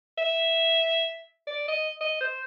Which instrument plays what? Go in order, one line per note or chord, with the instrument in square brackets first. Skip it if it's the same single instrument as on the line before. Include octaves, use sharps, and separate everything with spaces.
[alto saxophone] E5
D5
D#5
D#5
C5